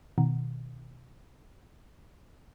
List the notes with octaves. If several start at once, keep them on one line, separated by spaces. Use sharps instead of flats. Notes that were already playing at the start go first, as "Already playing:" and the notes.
B2 D#3